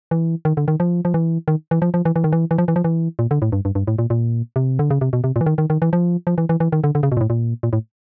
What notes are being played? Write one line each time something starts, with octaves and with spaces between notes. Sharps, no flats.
E3
D#3
D3
D#3
F3
F3
E3
D#3
E3
F3
F3
E3
E3
D#3
E3
E3
F3
E3
F3
E3
A#2
D3
A2
G2
G2
G2
A2
A#2
A#2
C3
D3
C#3
C3
B2
C3
A#2
E3
D#3
D#3
D#3
E3
F3
F3
E3
E3
E3
D#3
D3
D3
C#3
B2
A#2
A2
A#2
A#2
A2